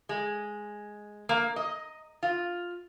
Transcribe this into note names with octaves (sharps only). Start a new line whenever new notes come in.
G#3
A#3
D#5
F4